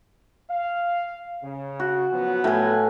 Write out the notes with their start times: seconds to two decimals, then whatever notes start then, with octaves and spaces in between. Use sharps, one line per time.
0.50 F5
1.43 C#3
1.80 F#4
2.12 F3 F#3 B3
2.44 A2 G#5